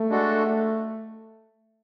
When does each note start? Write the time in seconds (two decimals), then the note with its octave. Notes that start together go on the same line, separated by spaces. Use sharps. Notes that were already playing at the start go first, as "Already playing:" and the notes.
Already playing: A3
0.09 G#3 D4 F#4 A4